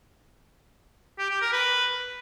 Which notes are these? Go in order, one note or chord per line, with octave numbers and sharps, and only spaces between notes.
G4
G4
A#4
B4